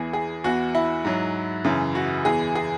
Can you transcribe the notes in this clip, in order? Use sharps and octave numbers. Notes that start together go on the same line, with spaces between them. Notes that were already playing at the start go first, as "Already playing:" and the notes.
Already playing: E2 E3 G#4
G#4
E2 E3 F#4
E4
G#2 F#3
F#2 C#3 E3
F#4
E2 E3 G#4
G#4